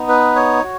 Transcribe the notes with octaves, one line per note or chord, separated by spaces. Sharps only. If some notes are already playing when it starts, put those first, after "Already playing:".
Already playing: B3 D#4
B4
C#5
F#4